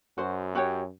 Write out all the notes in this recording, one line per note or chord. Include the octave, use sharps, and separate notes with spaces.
F#2 F#4 C5
F#4 G4 C#5